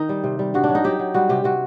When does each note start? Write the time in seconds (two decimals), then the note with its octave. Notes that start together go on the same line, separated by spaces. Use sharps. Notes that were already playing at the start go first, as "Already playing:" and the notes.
Already playing: D#3 D#4
0.09 G3
0.24 C3
0.39 G3
0.54 G2 F#4
0.64 D4
0.69 F#3
0.75 D#4
0.84 F#3 G4
0.99 F#3
1.14 G3 F#4
1.29 C3 G4
1.44 C3 F#4